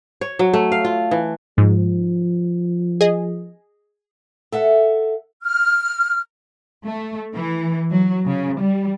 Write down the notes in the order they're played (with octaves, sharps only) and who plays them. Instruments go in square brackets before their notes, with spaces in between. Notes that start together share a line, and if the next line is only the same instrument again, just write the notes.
[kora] C#5
F#3
A3
F5
F4
E3
[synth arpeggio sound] G#2 [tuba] F3
[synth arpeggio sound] G#4 D#5
[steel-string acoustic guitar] A4 E5 F#5
[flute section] F6
[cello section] A3
E3
F#3
C#3
G3